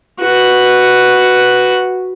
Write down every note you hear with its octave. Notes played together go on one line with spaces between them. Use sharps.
F#4 B4